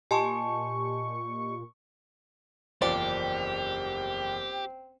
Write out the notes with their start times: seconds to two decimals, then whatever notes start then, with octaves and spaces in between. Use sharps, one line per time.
0.11 A#2 G4 D#5 G#5 A5 C6 C#6
2.82 F#1 E2 F3 C4 G4 D5